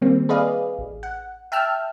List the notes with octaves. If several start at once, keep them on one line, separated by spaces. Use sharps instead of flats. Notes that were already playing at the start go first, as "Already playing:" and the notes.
D#3 G3 A#3 C4
G#4 B4 D5 D#5 F5
A1
F#5
E5 G5 A5 E6 F6